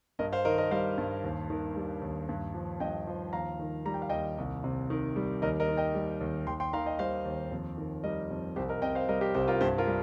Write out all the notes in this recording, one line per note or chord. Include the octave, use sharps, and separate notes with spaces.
G2 A#4 D#5
C5 F5
D#3 A#4 D#5
A#4 D#5
G3 C5 F5
G2
D#2
D#3
G3
D#2
G2
F3
G2 D#5 G5
F3
D#2 F5 A#5
D#3
G3 A#5
G5
F5
D#2 D#5 G5
C2
C3
D#3
G3
D#2 A#4 D#5
A#4 D#5
D#3
D#5 G5
G3
D#2
D#2 G5 C6
G5 C6
D#3 F5 A#5
D#5 G5
G3 C5 F5
D#2
F2
D#3
G3 A#4 D#5
F2
C2 G4 C5
A#4 D#5
C3 D#5 G5
C5 F5
G3 A#4 D#5
G4 C5
C2 G4 C5
F4 A#4
G2 G4 C5
F4 A#4
G3